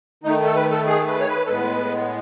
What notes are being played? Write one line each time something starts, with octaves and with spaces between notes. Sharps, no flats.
D#3 A3 D#4
A4
B4
A4
G#4
B4
C#5
B4
A4
A2 G#3 B3 B4